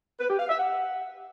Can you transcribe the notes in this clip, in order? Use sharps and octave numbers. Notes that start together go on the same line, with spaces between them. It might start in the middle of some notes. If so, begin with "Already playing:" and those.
B4
G4
F5
E5
F#5